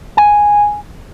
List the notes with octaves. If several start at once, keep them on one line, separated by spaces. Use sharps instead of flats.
G#5